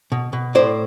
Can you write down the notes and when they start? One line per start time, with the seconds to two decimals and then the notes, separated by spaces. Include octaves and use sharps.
0.12 B2
0.33 B2
0.55 A2 C5 D5